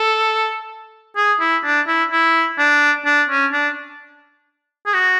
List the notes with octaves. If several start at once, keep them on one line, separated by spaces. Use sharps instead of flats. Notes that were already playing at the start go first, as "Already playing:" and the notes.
Already playing: A4
G#4
E4
D4
E4
E4
D4
D4
C#4
D4
G#4
F#4